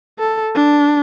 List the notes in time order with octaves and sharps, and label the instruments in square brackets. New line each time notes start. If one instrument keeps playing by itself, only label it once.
[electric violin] A4
D4